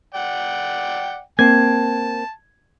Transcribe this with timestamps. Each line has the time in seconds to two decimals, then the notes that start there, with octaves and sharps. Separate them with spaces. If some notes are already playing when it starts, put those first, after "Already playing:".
0.14 D5 F#5 G5
1.39 A#3 C4 A5 G#6